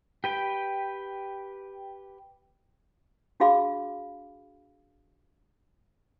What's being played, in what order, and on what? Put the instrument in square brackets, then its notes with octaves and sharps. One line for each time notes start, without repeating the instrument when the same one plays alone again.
[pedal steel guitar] G4 B4 G5
[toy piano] D4 F#4 G#4 F5 B5 D6